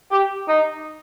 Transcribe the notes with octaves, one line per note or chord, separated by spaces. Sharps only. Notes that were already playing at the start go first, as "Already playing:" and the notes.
G4
D#4